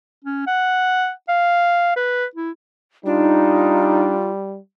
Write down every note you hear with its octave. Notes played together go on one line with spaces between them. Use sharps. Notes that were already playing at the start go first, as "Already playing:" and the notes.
C#4
F#5
F5
B4
E4
G3 D4 D#4 F4